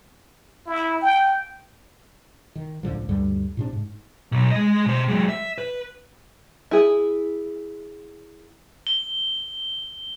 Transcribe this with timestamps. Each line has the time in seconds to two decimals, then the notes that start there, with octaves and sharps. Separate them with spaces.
0.67 E4
1.02 G5
2.55 D#3
2.83 C#2 A2 D3 F3
3.09 D2 G2 D3 G3
3.57 A2 C3 D4
3.73 G#2
4.32 B1
4.51 G#3 D#5
4.86 B2 C5
5.08 F#3 G#3
5.29 E5
5.58 B4
6.71 E4 G#4
8.87 G7